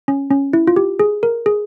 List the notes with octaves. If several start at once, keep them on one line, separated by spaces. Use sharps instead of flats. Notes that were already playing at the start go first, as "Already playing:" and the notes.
C#4
C#4
E4
F4
G4
G#4
A#4
G#4